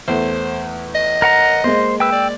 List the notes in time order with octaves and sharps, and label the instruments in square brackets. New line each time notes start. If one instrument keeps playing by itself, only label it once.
[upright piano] E2 A3 [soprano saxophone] C5
[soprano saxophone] D#5
[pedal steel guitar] A#4 F#5 A#5
[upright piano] G#3 A#3 [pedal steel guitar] C5
[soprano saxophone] B4 [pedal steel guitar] G5 E6
[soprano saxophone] D5